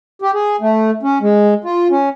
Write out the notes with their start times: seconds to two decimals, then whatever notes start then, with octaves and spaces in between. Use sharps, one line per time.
0.22 G4
0.34 G#4
0.61 A3
1.03 C#4
1.21 G#3
1.64 F4
1.90 C#4